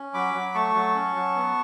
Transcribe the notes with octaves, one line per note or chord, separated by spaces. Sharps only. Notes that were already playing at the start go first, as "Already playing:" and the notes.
Already playing: C#4
F#3 B5 D6
F#3
A3 A5 C#6
F#3
C#4
F#3
B3